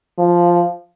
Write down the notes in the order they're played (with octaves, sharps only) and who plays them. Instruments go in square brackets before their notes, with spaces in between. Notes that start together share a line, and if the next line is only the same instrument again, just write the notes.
[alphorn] F3